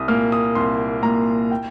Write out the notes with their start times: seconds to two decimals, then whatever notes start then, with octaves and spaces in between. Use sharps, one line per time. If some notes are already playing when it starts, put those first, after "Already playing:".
Already playing: C2 D#6
0.08 A#2 A#3 F6
0.32 D#6
0.55 C2 C6
1.03 A#2 A#3 A#5
1.51 G5